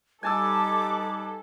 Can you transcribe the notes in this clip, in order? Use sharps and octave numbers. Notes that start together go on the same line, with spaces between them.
G3 D#4 A4 B4 G#5 A5 D6 E6